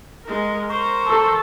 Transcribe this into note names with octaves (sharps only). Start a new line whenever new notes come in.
G#3 A#4
A#4 C5 C#6
A4